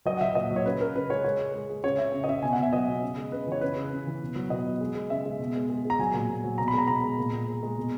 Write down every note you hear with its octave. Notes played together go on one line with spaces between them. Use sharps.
F#3 D#5
F#5
F#3 E5
A#2 D#5
F#3
C#5
C#3 B4
C#3 A#4
C#3 B4
G#3 C#5
G#3 C#5
G#3
G#3
G#3
C#3 C#5
C#3 E5
C#3
D#5
C#3 E5
B2 G#5
F#5
B2 E5
F#3 D#5
B2
C#3
G#3
C#3 B4
E3 C#5
C#3 B4
C#3
C#3
E3
B2
F#3
B2 D#5
F#3
G#3
G#3
C#3 E5
G#3
B2
G#3
G#3
G#3 A#5
F#3 G#5
A#2
A#2
F#3
B2 A#5
B5
G#3 A#5
B2 A#5
G#3
A#2
A#2
G#3
G#3
B2